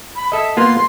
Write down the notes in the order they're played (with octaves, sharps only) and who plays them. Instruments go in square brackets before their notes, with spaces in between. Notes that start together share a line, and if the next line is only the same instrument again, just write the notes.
[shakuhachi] B5
[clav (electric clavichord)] A4 D#5 [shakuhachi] E5
[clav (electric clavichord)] A#3 B3 F4 [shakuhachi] C6